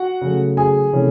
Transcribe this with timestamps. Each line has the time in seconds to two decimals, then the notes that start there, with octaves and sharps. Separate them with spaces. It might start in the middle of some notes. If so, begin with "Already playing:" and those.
Already playing: F#4 F#5
0.21 C#3 F#3 A3
0.57 G#4 G#5
0.93 C3 E3 A3 C#4